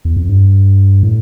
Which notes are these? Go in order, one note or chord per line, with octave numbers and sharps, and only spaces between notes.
E2
F2
G2
A2